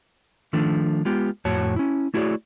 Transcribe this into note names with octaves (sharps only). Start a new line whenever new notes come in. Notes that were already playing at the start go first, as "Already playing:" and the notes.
D#3 F3 A3 D4
G#3 B3 F4 G4
F2 A2 F#4 C#5 A5
C#4 E4
A3 E4 F#4 G#4 C#5 D5